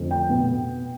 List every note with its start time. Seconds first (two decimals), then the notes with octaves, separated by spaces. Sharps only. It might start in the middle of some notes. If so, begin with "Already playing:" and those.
Already playing: F2 D3 A3 C4
0.11 G5
0.30 B2 B3